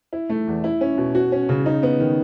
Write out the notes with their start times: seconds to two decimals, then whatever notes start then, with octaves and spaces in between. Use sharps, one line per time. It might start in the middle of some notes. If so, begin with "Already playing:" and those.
0.13 E4
0.30 A3
0.47 E2
0.64 E4
0.81 C#4
0.98 B2
1.15 F#4
1.32 C#4
1.49 C#3
1.66 D#4
1.83 B3
2.00 D#3